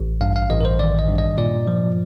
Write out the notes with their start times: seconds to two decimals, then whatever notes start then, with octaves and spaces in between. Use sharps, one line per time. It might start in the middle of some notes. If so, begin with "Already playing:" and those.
Already playing: A1
0.21 G2 F5
0.36 F5
0.50 A1 D#5
0.61 A#4
0.65 C5
0.79 D#3 D5
0.99 D#5
1.09 G2
1.18 D#5
1.38 A#2 D5
1.67 F3